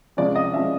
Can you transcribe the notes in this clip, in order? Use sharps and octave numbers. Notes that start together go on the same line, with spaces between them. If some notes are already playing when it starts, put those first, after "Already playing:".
C3 F3 G#3 C#4 D5
D#5
C3 F3 G#3 C#4 E5